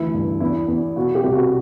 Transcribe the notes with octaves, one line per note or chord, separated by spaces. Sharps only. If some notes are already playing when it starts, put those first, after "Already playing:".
Already playing: D2 E3 E4
G2
E2 E4
E2
B2 F#4
G4
C2
F#4